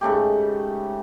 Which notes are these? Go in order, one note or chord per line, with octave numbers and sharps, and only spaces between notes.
G#2 C#3 A3 G4